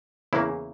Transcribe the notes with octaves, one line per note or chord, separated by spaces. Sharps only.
E2 C#3 E3 A#3 E4